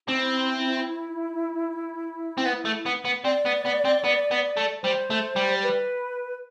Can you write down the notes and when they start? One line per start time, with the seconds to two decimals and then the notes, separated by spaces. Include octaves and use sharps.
0.08 C4 E4
2.38 C4
2.45 B3
2.65 A3
2.86 B3
3.05 B3
3.24 C4 D5
3.45 B3
3.65 B3
3.85 C4
4.04 B3
4.31 B3
4.57 A3
4.83 G3 C5
5.10 A3
5.36 G3
5.63 B4